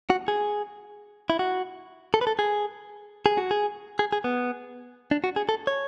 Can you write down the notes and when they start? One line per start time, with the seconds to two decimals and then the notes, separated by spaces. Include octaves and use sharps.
0.10 F#4
0.28 G#4
1.30 E4
1.39 F#4
2.14 A4
2.21 B4
2.27 A4
2.39 G#4
3.26 G#4
3.38 F#4
3.51 G#4
3.99 G#4
4.13 G#4
4.24 B3
5.11 D4
5.24 F#4
5.36 G#4
5.49 A4
5.67 C#5